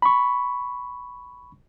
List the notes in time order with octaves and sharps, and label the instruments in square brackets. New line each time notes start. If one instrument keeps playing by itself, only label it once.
[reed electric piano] B5 C#6